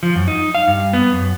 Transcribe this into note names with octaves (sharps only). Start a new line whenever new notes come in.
F3
F#2
D#4
F5
G2
B3
F#2